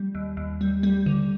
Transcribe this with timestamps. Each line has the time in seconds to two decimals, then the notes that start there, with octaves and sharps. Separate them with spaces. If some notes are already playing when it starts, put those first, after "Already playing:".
Already playing: G3
0.15 D#2
0.37 D#2
0.61 G3
0.83 G3
1.06 D3